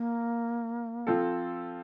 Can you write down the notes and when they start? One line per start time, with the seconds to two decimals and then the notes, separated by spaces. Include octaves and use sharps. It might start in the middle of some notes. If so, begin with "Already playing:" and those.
Already playing: A#3
1.07 F3 C4 F4 A4